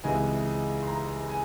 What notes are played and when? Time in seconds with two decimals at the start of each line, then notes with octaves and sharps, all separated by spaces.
0.04 C#2 C3 E3 G#3 G#5
0.83 C6
0.87 A#5
1.29 G#5